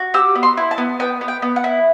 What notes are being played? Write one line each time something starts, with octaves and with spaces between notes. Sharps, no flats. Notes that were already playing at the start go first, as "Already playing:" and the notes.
Already playing: F#4
G4 E6
B3
C6
E4
A5
B3
B3 G5
B3
G5
B3
F#5
E4